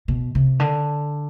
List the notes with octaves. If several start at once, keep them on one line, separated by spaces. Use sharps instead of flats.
B2
C3
D3